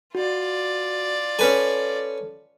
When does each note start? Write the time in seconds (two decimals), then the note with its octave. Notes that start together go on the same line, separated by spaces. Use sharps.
0.15 F4 F#4 D5
1.39 C#4 A4 B4 G#5